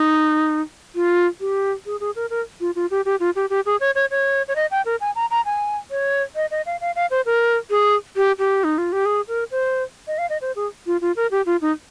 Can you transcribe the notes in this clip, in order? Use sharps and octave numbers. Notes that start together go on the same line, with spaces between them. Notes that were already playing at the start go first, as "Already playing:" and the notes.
Already playing: D#4
F4
G4
G#4
G#4
A#4
A#4
F4
F4
G4
G4
F4
G4
G4
G#4
C#5
C#5
C#5
C#5
D#5
G5
A#4
G#5
A#5
A#5
G#5
C#5
D#5
D#5
F5
F5
F5
C5
A#4
G#4
G4
G4
D#4
F4
G4
G#4
A#4
C5
D#5
F5
D#5
C5
G#4
F4
F4
A#4
G4
F4
D#4